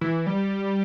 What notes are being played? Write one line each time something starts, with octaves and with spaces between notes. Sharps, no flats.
E3
G3